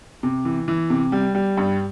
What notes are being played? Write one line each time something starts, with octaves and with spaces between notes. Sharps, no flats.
C3
E3
E3
C3
G3
G3
G2